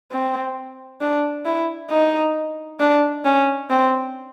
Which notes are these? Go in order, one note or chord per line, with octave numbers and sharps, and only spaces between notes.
C4
D4
E4
D#4
D4
C#4
C4